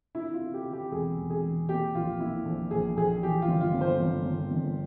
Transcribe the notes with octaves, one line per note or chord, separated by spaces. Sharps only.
C3 E4
F4
C3
G4
C3
G4
E1 G#4
E1
G#4
E1
A#2 G4
A#1 F4
A#2 E4
A#1
A#1 G#4
A#1 G#4
E3 G4
F4
G1
F4
G1
C5
G1
G1
G1